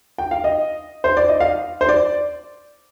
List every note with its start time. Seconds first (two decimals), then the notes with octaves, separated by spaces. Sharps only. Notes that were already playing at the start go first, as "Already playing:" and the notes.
0.18 G5
0.31 F5
0.44 D#5
1.04 C5
1.17 D5
1.29 D#5
1.40 F5
1.81 C5
1.89 D5